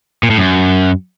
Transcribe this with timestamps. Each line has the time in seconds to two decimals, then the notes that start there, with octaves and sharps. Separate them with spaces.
0.23 A#2
0.30 A2
0.37 F#2